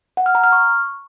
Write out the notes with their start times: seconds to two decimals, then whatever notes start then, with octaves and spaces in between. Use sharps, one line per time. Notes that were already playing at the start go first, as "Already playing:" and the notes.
0.17 F#5
0.26 F6
0.35 A#5
0.44 F6
0.52 C#6